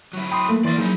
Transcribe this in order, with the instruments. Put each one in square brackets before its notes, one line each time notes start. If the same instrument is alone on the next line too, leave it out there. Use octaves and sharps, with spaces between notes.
[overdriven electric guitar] F#3 E4
[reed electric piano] G5 C6 [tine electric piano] B5 D#6
[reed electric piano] A3 [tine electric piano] A#3
[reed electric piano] E3 C6 A6 [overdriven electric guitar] D5 E5
[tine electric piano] F3 F#3 [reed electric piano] A#3 G#4 [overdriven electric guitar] D#4 E4